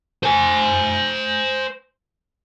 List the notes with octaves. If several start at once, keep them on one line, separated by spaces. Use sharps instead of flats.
C5 G#5